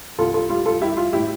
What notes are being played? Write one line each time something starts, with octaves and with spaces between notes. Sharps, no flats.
C2 F4 A4
F4 A4
G3 F4
F4 A4
G3 E4 G4
F4
A2 E4 G4